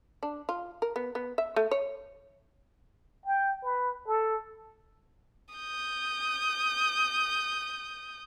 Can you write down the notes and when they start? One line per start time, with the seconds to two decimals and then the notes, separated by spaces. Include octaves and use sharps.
0.23 D4
0.49 F4
0.82 A#4
0.96 B3
1.15 B3
1.38 E5
1.56 A3
1.71 C#5
3.26 G5
3.64 B4
4.07 A4
5.54 D#6 G6